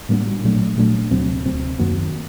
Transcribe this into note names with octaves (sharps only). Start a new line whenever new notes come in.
A2 G3 A#3 D4 F#4
A#1 A#2 F#3 A3 D4
A#1 A#2 F#3 A3 D4
D2 C3 F#3 C4
D2 C3 F#3 C4
F#2 D#3 F#3 A#3 F#4